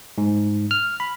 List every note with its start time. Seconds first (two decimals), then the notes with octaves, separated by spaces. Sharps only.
0.18 G#2
0.71 F6
1.00 B5